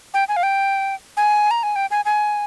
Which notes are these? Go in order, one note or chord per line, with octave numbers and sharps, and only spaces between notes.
G5
G#5
F5
G5
G#5
A#5
G#5
G5
G#5
G#5